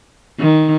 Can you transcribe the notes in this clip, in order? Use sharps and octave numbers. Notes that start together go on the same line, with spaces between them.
D#3